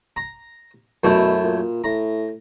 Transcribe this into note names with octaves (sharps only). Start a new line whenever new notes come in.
A#5
F#2 B2 A3 E4
A#2
A2 A#5